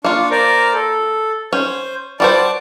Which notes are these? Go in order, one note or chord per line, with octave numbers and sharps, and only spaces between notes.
A#3 D4 F4 C#6
A#4 C5 D5
A4
C#4 C5
G3 F#4 C5 D5 A5